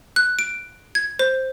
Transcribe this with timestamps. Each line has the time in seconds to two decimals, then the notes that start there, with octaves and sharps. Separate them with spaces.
0.16 F#6
0.39 D7
0.95 G#6
1.19 C5